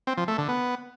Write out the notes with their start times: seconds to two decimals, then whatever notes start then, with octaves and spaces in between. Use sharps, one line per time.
0.07 C4
0.18 F3
0.28 A3
0.38 D3
0.49 B3